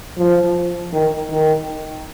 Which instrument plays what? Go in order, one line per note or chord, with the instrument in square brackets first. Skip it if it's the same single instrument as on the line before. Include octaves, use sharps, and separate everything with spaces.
[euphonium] F3
D#3
D#3